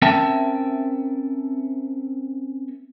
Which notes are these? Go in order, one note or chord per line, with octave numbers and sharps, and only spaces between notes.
C4 C#4 A#4 E5 G5 A5